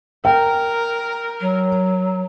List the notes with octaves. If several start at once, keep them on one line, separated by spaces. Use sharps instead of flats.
A#4 G5
F#3